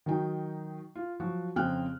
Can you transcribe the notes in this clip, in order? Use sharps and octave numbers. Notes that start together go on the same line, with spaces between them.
D#3 F#3 D#4 G5
F4
F3 F#3 F#4
F2 C#3 C4 G5 F6 F#6